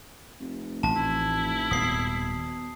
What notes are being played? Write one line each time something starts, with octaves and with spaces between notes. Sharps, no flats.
F1
A1 A5
E4
D#1 D#2 G#2 B2 D#6 C7